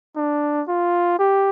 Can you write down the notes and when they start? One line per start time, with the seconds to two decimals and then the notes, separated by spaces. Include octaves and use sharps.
0.16 D4
0.68 F4
1.19 G4